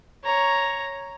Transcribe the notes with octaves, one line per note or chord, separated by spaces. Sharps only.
C#5 A#5